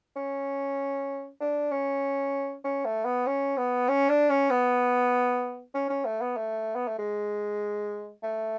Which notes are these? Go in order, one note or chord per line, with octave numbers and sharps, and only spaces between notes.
C#4
D4
C#4
C#4
A3
B3
C#4
B3
C#4
D4
C#4
B3
C#4
C#4
A3
B3
A3
B3
A3
G#3
A3